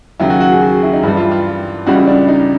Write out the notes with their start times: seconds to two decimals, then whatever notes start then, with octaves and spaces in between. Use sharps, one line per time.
0.20 D#2 C#3 F#3 E4
0.30 F#4
0.40 F#4
0.52 G#4
0.61 F#4
0.83 E4
0.93 D#4
1.03 G2 E3 G3 E4
1.17 F4
1.32 F4
1.86 C#2 C#3 E3 G3 F#4
2.07 D4
2.28 D#4